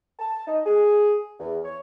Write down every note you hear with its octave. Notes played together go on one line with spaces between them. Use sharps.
A5
D#4
G#4
E2
C#5